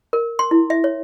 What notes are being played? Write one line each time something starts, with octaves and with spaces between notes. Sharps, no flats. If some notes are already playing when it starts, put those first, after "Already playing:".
A#4
C6
E4
E5
C#5